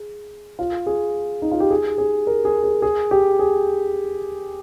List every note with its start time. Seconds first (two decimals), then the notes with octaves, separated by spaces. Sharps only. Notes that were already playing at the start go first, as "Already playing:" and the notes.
Already playing: G#4
0.59 F4
0.86 G#4
1.42 D#4
1.52 F4
1.60 G4
1.70 G#4
1.98 G#4
2.27 A#4
2.45 G#4
2.64 G#4
2.82 G#4
3.11 G4
3.39 G#4